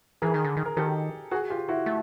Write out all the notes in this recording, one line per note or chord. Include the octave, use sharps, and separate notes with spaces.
E3 G#4 A#4
D#3
D3
D#3
A#4
D#3 G4 A4
F#4 G#4
F4 G4
E4 F#4
A3